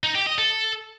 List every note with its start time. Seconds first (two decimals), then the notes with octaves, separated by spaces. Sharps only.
0.03 D#4
0.15 G4
0.27 D#5
0.38 A4